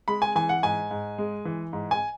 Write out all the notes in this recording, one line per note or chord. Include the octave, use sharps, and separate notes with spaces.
G#3 B5
G#5
E3 G#5
F#5
G#2 G#5
G#2
G#3
E3
G#2
G#5